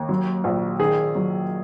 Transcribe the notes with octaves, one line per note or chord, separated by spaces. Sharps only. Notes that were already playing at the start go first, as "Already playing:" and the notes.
Already playing: D#2
F#3
A#1
D#3 G#4
F#3